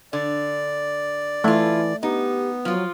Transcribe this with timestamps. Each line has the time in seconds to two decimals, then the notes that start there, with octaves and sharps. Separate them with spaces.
0.13 D3 D5
1.44 E3 A3 E4 F4
2.03 B3 D#4 G4
2.65 F3 F#3 F4